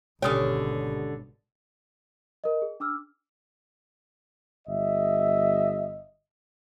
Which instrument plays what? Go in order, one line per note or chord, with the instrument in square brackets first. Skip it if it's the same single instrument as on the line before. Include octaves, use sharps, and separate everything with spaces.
[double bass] G#1 B2 [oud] D3 C#4 G4 [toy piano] C#5 D#6
[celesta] A#4 D#5
G#4
D4 D6 E6 F6
[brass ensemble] G1 D#5 E5